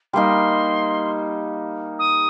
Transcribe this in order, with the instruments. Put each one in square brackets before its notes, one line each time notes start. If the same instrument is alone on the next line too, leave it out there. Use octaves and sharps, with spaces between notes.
[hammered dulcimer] G3 A#3 D#4 [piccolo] C6
[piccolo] D#6